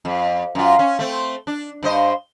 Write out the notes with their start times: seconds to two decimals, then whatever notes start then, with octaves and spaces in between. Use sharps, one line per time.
0.05 F2
0.55 F#2 F4
0.79 C#4
0.99 A3 C4
1.47 D4
1.83 G2 C5 D#5